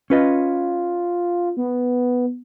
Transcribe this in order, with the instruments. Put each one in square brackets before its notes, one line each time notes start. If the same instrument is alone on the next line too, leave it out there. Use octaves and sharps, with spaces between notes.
[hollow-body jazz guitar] C#4 B4 D#5 [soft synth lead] F4
[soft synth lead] B3